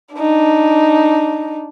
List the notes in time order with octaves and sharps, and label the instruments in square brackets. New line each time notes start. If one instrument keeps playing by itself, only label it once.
[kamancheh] D4 D#4